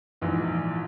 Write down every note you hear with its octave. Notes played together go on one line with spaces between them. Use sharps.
A#1 G#2 E3